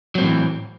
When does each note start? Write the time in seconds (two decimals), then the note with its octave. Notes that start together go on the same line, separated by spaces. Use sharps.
0.15 F#3
0.18 C4
0.21 A2
0.24 E3